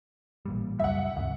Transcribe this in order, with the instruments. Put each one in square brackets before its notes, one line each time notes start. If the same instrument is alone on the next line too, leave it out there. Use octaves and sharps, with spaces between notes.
[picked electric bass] A1 A#2 G3
[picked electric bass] C#2 F#2 G3 [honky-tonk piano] E5 F#5
[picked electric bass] D2 G2 C3 [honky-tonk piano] F#5